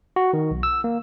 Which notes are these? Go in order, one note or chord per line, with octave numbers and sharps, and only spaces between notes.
F#4
D#3
B1
E6
A#3